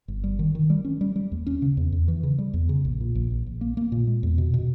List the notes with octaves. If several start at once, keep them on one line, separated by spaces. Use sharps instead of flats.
G1
G3
D#3
D#3
G3
C#4
G3
G3
D#2
C#4
C#3
E2
E2
E3
C#3
G3
E2
C#3
A#1
A#2
A#1
A#1
A#1
A#3
A#3
A#2
G#3
E2
B2
B2